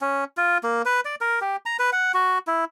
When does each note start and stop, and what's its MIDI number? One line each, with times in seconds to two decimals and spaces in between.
0.01 0.24 61
0.37 0.58 65
0.63 0.82 58
0.86 1.00 71
1.05 1.15 74
1.21 1.40 70
1.41 1.56 67
1.66 1.77 82
1.79 1.90 71
1.92 2.12 78
2.14 2.38 66
2.47 2.65 64